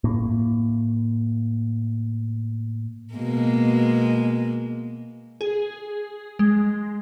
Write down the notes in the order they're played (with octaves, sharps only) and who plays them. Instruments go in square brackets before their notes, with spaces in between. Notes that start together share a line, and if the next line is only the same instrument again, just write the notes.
[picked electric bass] A2 A#3
[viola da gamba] B2 G#3 A#3
[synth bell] G#4
G#3